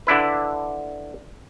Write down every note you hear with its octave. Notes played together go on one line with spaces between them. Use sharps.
D3 D4 E4 B4